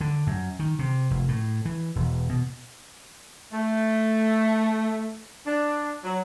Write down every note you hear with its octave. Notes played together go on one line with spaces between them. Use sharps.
D3
F#2
D#3
C3
F1
A2
E3
E1
B2
A3
D4
F#3